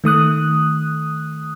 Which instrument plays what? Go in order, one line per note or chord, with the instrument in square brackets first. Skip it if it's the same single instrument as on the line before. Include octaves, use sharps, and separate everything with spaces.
[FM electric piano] D#3 A3 D#6 F#6